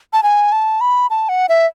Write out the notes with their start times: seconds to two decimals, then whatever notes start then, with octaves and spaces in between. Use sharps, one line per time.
0.13 A5
0.23 G#5
0.52 A5
0.81 B5
1.10 A5
1.29 F#5
1.49 E5